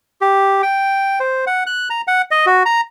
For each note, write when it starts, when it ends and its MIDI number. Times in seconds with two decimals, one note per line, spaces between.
0.21 0.62 67
0.63 1.19 79
1.20 1.45 72
1.47 1.64 78
1.66 1.89 90
1.90 2.02 82
2.08 2.22 78
2.31 2.46 75
2.46 2.63 66
2.66 2.81 82